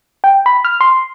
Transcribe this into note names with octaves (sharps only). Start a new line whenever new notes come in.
G5
B5
F6
C6